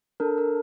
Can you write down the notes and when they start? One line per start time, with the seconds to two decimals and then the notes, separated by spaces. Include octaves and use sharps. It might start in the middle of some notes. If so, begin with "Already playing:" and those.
0.20 D4 A4 A#4
0.38 A#4